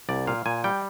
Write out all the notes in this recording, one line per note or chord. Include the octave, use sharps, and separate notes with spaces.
C2 D5
A#2 F5
A#2 G#5
G3 G5